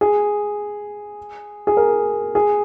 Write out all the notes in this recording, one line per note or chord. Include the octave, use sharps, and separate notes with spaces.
G#4
G#4
A#4
G#4